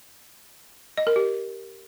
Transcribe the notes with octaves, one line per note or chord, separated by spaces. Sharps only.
D#5
A#4
G4